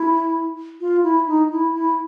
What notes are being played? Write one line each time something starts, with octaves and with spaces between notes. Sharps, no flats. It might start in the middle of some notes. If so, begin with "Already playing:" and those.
Already playing: E4
F4
E4
D#4
E4
E4